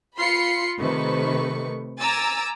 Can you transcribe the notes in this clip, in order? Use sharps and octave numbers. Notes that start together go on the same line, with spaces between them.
F4 B5 C6 C7 C#7
C3 D#3 A3 B4 C#6
G#5 A#5 D6 E6 A6